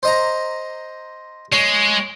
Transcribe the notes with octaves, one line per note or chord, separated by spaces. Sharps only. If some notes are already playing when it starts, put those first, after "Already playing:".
C5 D#5 A#5
G#3 C#5